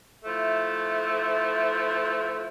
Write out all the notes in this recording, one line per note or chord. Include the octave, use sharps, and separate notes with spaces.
F3 A3 E4